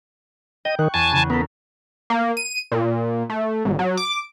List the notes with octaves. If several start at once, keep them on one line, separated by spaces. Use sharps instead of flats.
D#5 G5
D#3 C#6 F#6
E2 G#5 A5
E2 C#3
B3 A4 A#4
A#3
D#7
A#2
A3
G#1
F#3
D6